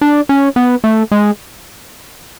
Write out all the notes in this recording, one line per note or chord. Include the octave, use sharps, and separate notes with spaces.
D4
C#4
B3
A3
G#3